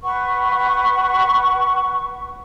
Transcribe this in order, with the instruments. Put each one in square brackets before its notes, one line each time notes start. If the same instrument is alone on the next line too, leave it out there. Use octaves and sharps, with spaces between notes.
[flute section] B4 F#5 C#6